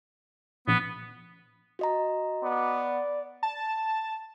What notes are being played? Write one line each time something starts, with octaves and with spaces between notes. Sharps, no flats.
A#1 B3
F#4 D#5 A#5
B3 D5
A5